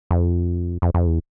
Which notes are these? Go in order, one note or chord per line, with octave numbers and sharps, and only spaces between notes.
F2
F2
F2
E2